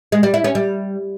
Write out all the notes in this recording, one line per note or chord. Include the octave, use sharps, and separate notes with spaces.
G#3
G3
E4
C#4
G3